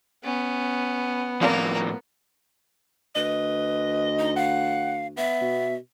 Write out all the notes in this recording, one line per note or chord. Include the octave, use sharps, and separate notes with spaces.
B3 C#4
A2 F3 A#3 C4 F4 A#4 D5
D2 B4 D#5
D#4
F5 F#5
B3 E5
B2